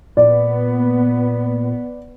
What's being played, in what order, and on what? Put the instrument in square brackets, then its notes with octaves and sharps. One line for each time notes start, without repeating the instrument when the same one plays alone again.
[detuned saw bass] A#2 [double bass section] B3 [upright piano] D5